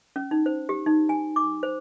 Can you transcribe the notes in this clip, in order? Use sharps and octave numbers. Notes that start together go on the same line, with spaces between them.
C#4
D#4
C5
G4
D#4
G#5
D6
C5